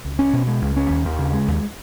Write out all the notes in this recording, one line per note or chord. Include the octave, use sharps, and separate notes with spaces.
C#2
C#4
B2
G#3
C#2
C#4
D#2
D#2
C#3
G#3
D#2